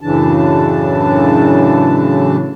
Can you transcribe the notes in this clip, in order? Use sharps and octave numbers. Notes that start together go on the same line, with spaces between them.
F#2 A2 C#3 E3 D4 A5